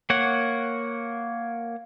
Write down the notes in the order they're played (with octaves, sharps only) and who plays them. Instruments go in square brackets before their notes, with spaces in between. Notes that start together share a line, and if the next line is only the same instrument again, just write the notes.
[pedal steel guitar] A#3 C#5 F#5